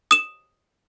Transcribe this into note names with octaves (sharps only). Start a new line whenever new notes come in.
D#6 E7